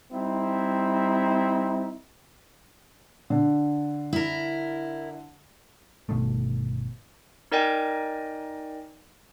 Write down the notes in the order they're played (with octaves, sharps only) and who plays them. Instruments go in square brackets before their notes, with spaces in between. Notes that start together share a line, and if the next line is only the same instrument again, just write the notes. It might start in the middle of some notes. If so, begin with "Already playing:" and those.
[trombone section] G3 C4 D#4 E4
[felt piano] D3
[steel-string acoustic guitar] E4 A#4
[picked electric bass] G1 B2 D#3 A3
[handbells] D#4 A#4 D5 D#5 G5 G#5